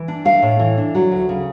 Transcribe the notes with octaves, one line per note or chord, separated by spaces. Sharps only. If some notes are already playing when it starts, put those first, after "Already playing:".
Already playing: E3
D4
A3 F5
A2
E3
D4
F#3
D2
C#3